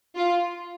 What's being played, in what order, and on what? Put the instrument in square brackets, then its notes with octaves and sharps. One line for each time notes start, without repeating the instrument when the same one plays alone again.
[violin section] F4